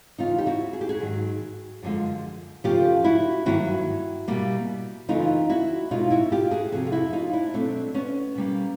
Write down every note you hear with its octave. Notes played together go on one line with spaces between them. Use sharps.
D#2 C#3 E3 D#4 F4
G4
E4 F#4
G#4
G4
F#4 G#4
G#2 D#3 F#3
F#2 D3 F3 G#3
F2 C#3 F3 A3 F4 G4
E4 F#4
G2 D#3 F#3 A#3 E4 F#4
B2 G3 A#3
F#2 C#3 E3 A3 D#4 F4
E4 F#4
B2 G#3 D#4 F4
E4 F#4
F4 G4
F#4 G#4
F2 C3 F3 F#4 G#4
F4
E4 F#4
D#4 F4
D4 E4
B2 F#3 A3 C4 D4
B3 C#4
B2 G3 A#3